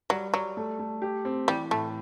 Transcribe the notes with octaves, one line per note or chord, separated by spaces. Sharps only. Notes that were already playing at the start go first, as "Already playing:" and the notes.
F#3 G3
F#3 G3
A3
A3
G4
C4
E3 G3
A2 A3